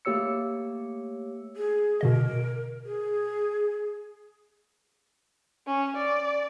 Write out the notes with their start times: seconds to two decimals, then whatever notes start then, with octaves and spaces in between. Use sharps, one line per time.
0.05 A3 A#3 G4 C#5 E6 C#7
1.56 G#4
2.01 B2 D3 A#4 D#5
2.85 G#4
5.67 C#4
5.97 D5